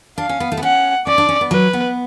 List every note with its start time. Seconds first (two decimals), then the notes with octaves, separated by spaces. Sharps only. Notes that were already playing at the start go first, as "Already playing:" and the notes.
0.18 D4 F5
0.29 C#4
0.40 B3
0.52 A3
0.57 B3
0.63 C#4 F#5
1.07 C#4 D5
1.18 D4
1.29 C#4
1.41 B3
1.51 F#3 B4
1.73 B3